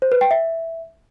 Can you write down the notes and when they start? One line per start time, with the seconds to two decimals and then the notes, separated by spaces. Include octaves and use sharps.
0.02 C5
0.12 B4
0.21 G5
0.31 E5